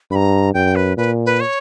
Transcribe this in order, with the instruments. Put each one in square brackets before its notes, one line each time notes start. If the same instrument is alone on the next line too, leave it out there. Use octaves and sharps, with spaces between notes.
[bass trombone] G2 [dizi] B5
[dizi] A#5
[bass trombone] F#2 [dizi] G5
[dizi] B4
[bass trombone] A#2 [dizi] B4
[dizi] B4
C#5